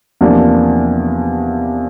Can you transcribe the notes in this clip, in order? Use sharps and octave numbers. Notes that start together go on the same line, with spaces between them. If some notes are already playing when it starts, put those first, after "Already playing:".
E2 C3 F3 A#3 D4